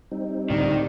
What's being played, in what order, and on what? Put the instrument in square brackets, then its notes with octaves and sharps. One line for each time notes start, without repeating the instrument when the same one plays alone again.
[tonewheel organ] G3 C4 D#4
[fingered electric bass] C#2 A2 D3 [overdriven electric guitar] D#3 [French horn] D5